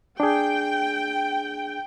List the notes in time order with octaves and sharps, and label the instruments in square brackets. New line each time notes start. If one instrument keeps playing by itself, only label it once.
[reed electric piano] D4 G#4 [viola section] G5